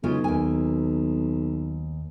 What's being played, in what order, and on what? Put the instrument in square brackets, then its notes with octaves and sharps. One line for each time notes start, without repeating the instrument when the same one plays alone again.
[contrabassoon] B1 [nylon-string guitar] C#3 G#3 F4
[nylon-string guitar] D#2 G#5